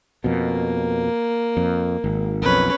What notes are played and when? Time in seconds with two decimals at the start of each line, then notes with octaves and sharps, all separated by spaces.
0.24 F2 B2 A#3
1.57 F2
2.04 G#1
2.42 B1 F2 C#4 B4